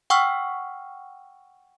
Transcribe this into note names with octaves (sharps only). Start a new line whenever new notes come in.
F#5 G5 C#6 E6 F6